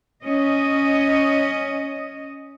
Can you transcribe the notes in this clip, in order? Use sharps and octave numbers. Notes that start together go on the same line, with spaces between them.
C#4 D#5